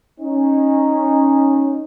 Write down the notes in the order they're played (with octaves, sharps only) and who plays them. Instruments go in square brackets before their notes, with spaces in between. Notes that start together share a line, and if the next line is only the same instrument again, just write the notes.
[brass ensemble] C#4 D#4